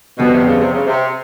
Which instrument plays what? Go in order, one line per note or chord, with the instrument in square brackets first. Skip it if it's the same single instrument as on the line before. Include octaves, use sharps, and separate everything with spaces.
[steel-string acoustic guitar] F2 D3 G3 B3 [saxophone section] B2
[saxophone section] C3
C#3
C3
C#3
C3